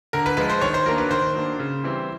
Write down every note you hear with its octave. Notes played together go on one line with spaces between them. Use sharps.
D3 A#4
B4
F3 G#3 B4
C5
D#3 C#5
C5
F#3 A#3 D4 A#4
B4
D#3 C5
F#3 A#3 D4
C#3
E3 G3 C4